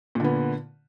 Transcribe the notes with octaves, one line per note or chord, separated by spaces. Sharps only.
A#2 D3 B3